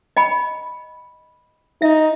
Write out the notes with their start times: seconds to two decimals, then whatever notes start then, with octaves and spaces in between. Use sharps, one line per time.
0.17 D#5 G5 B5
1.82 D#4 E5